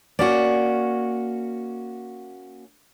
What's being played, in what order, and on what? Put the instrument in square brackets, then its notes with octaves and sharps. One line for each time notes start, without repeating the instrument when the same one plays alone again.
[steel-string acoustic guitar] A#3 C#4 F#4 [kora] D5